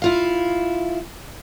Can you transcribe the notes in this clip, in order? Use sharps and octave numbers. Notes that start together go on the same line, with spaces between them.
E4 F4 F5